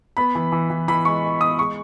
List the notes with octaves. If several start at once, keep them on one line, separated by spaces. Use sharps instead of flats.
B3 B5
E3
E3
E3
E3 B5
G#3 C#6
G#3
B3 D#6
G#3 C#6